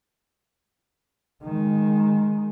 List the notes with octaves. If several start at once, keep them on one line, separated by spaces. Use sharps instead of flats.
D#3 G#3